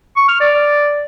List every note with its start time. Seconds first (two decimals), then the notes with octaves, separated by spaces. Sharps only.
0.16 C#6
0.28 F6
0.40 D5